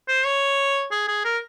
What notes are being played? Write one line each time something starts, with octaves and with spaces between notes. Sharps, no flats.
C5
C#5
G#4
G#4
A#4